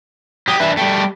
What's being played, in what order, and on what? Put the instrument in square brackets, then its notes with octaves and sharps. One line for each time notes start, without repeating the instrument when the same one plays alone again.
[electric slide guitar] F#3 G4 [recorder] D#6
[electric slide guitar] E3 D4 B4 [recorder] E5
[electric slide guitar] G3 A3 [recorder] G5